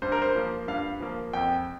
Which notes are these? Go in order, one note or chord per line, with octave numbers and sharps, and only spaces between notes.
G2 C5
A#4
C5
F3 A#3
G2 F5
F3 A#3
F2 G5